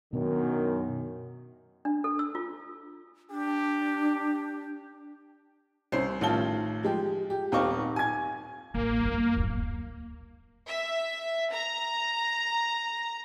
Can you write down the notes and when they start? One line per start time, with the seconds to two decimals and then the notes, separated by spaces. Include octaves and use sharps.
0.13 F#2 B2 D#3 B3 D4
1.85 D4
2.04 A4
2.19 E6
2.35 F4
3.31 D4 G4
5.92 C2 C#4 C5 C7
6.21 A1 D#3 F4 A5 G7
6.83 F3 G#3 G4
7.30 G4
7.52 D#1 C4 D#4 F5 C#6 D6
7.96 G#5 G#6
8.74 A1 A#3
9.01 G1 F#2
9.37 D1 F#3
10.68 E5
11.53 A#5